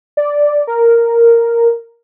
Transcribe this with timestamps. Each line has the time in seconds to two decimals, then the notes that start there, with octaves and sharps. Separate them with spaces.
0.17 D5
0.67 A#4